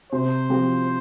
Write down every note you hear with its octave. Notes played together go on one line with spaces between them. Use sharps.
C3 C5
F3 C4 G4